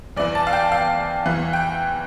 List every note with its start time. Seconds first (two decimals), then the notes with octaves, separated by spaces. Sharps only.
0.17 E2 E3 D5
0.35 A5
0.47 F5
0.53 G5
0.72 F5
1.26 E2 E3
1.53 G5